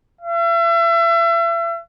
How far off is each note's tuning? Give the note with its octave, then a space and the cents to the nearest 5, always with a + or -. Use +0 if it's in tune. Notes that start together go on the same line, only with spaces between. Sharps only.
E5 +35